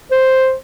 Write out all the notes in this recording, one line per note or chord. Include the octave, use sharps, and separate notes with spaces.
C5